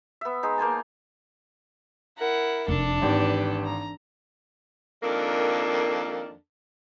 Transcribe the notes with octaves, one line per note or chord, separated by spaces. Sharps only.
B3 E5
G#3 D#4
A#3 C5 G#5 A5
E4 A#4 F#5
F1 F2 D4 A4
G#1 E3 G4 B4
A#5
F2 D#3 A#3 D4 A4 A#4